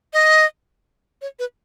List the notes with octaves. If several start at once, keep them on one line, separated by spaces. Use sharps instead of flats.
D#5
C#5
B4